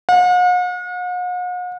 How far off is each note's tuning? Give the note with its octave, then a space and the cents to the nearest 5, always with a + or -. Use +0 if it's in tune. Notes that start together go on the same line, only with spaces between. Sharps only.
F#5 -45